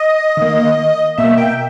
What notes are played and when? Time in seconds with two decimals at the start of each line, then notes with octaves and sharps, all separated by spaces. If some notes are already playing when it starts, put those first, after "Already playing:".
Already playing: D#5
0.37 D#3 A#3
1.18 B2 A#3 E5
1.38 G5